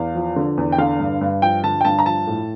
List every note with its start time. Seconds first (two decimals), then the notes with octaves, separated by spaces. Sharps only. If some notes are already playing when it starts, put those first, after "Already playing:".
Already playing: E2 F5
0.15 F3
0.36 D3
0.57 E2
0.72 G5
0.78 D3 F5
1.00 G2
1.21 G2
1.42 F3 G5
1.64 D3 A5
1.81 G5
1.85 G2 A5
1.99 A#5
2.06 F3 A5
2.27 A2